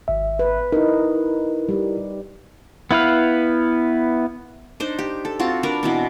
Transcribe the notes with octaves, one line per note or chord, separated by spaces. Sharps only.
G#1 E5
B4
D#4 E4 A#4
G3
B3 E4 B4 F5
D4 D#4 C5
G4
A4
C4 F4 F#4 A5
D4 A#4 B4
B2 E3 C4